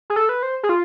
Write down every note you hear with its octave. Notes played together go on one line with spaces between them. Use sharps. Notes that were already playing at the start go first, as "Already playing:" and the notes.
G#4
A4
B4
C5
G#4
F4